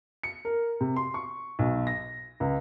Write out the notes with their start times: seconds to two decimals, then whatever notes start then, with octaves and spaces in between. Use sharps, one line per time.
0.23 C#7
0.45 A#4
0.80 C3
0.96 C6
1.14 C#6
1.59 B1
1.87 A#6
2.40 C#2